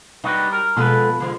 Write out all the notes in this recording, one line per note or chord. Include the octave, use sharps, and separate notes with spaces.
G3 D#4 F#4 B4
A#4
B2 F3 G#3 A4 B4
D3 F3 G#3